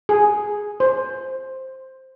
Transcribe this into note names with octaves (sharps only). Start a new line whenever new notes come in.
G#4
C5